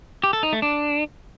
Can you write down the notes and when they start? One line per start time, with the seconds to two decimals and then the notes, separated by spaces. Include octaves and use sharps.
0.24 G4
0.33 A4
0.43 D#4
0.53 A3
0.62 D4